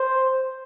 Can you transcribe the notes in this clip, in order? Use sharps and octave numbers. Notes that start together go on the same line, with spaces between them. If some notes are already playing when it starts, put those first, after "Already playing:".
Already playing: C5